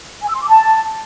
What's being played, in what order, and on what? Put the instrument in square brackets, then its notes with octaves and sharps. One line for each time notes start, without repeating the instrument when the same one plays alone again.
[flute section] G#5
E6
C6
D6
A5